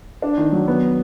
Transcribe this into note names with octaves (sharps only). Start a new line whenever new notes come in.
D4
D#3
F#3
B3